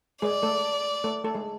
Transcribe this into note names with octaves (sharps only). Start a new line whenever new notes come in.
G#3 G#4 D5
A3 A4
A3 A4
A3 A4
G#3 G#4